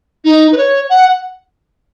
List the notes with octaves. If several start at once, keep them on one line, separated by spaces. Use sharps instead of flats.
D#4
B4
C#5
F#5